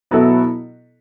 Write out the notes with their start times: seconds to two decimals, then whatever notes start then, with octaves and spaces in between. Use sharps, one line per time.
0.11 B2 F#3 B3 E4 A4